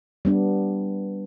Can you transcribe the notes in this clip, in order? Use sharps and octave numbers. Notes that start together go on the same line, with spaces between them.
G3 B3 D4